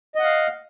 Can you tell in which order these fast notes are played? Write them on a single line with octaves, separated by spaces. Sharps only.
D#5 F#5 F5